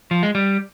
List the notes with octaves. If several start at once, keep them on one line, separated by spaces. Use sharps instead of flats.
F3
G#3
G3